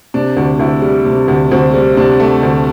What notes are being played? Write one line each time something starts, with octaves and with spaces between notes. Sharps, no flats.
C3 D4
D2
D2 E4
G3
C3
D2
D2 C4
G3
C3 D4
A3
D2